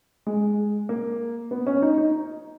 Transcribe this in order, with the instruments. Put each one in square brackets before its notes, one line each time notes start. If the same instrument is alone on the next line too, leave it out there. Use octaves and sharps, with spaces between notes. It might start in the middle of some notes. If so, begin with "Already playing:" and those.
[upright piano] G#3
A#3
B3
C#4
D#4
D#4